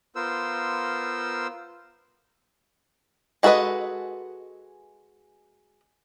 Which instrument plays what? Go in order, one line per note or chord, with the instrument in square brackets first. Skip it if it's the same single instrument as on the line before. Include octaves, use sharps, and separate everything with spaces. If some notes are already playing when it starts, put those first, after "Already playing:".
[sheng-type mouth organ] B3 F4 A#4 C5 E6
[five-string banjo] G#3 F#4 A4 B4 D#5